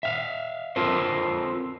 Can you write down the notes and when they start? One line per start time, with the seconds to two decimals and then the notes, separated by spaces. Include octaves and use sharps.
0.03 E5 F5
0.76 C4 F4 A4 A#4 C5